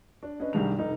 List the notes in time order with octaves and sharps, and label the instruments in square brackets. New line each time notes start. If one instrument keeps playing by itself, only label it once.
[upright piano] D4
C#4 D4 B4 D#5
C2 G2 D#3 G3 G#4 F7
F1 D#4